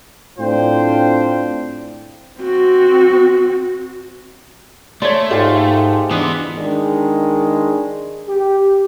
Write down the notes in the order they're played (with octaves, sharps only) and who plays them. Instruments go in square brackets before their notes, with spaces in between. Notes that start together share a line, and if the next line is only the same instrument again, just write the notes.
[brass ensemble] A2 C4 D4 F4 C5 G5
[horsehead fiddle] C4 F#4
[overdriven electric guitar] A3 [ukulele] C#5 D5 [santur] C6
[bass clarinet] G#2 [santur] G#3 F4 G4 [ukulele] A4 F5
[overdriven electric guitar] E3 B3 [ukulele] D4 [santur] D#6
[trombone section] D#3 G#3 D4
G4